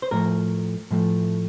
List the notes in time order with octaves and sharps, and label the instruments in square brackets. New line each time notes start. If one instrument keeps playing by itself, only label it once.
[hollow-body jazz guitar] C5
A2 F3 A3 A#4
A2 F3 A3